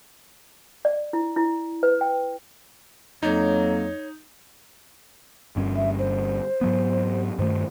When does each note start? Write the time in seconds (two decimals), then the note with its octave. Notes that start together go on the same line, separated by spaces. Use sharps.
0.85 D5
1.13 E4
1.36 E4
1.83 B4
2.01 G5
3.23 F2 F#3 A#3 D#4 C#5
5.56 G1 G2 C#4
5.75 E5
5.99 C5
6.61 G#2 F#3 B3
7.39 G2 D#3 A3 C5